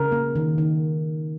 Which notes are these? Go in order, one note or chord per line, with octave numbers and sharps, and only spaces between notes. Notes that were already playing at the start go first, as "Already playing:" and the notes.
Already playing: C#3 A#4
A#3
D#3
D#3